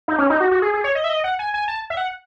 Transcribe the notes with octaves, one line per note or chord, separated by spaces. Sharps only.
D#4
C#4
D#4
F#4
F#4
G#4
G#4
C#5
D#5
E5
D#5
F#5
G#5
G#5
A5
E5
F#5